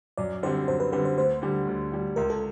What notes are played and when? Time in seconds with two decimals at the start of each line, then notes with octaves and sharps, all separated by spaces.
0.18 F#2 D5
0.43 D3 G3 C4 C5
0.68 F#2 C5
0.80 B4
0.92 D3 G3 C4 B4
1.05 C5
1.18 D2 C5
1.42 D3 G3
1.67 D2
1.92 D3 G3
2.16 C#2 A#4
2.30 A4